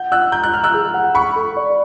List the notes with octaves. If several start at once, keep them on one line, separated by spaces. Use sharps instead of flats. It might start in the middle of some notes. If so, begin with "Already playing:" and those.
Already playing: F#5 G6
F#5 E6 F#6
A#5 G6
F#6
A#5 F6
E6 F#6
G#4
F#5
F#5 B5 C#6
A4
D5